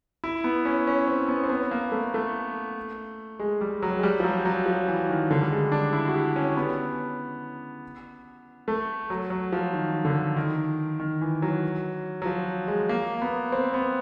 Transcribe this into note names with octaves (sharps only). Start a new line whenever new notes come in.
E4
B3
C#4
C#4
C4
B3
C4
B3
A#3
A3
A3
G#3
G3
F#3
G#3
G3
F3
F#3
F#3
F3
E3
D#3
D3
G3
G#3
D4
E4
F#4
G4
C#4
B3
A3
F#3
F#3
F3
D#3
D3
D#3
D#3
E3
F#3
F#3
F3
G#3
A#3
B3
C4
B3